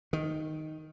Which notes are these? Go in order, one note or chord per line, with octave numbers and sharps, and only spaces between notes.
D#3